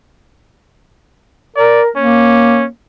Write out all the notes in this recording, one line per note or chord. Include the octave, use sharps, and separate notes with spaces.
A#4 D5
A#3 C#4